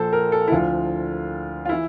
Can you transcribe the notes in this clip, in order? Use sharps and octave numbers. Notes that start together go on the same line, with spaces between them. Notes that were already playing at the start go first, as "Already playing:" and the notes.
Already playing: A#1 A#2 F3 A4 C5
A#4
A4
E4
D2 D3 F3 F4
F4
E3 E4